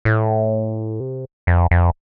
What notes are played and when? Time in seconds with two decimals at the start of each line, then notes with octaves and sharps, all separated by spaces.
0.05 A2
1.00 C3
1.47 F2
1.71 F2